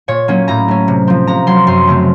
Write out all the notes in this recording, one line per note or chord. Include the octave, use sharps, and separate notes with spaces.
A#2 C#5
F#3 A#3 C#4
A2 A#5
A3 C#4
C3
F3 C4
C3 A#5
F#3 C4 C6
F#2 C6
C#3 A3 C4